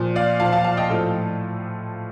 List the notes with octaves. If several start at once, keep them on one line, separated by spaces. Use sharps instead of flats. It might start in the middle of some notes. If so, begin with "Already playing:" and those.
Already playing: A#2 F3
D5 F5
A#2 F3 F5 A5
F5 A5
F5 A5
D#5 G5
A2 F3 F4 A4